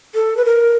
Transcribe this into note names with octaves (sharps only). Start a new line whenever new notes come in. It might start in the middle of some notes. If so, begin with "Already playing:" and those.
A4
B4
A#4